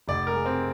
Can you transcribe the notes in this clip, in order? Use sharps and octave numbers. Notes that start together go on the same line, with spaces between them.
F1 D5
A#4
G#3
C4